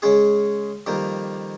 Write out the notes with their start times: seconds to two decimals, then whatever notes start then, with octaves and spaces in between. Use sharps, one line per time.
0.02 C#3 G#3 C#4 G#4
0.86 F2 D#3 G3 A#3